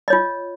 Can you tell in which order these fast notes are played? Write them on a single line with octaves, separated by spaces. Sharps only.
D#5 C#5 F4